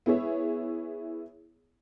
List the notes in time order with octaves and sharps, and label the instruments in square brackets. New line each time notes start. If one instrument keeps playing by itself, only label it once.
[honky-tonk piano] B3 E4 G#4 C#5 E5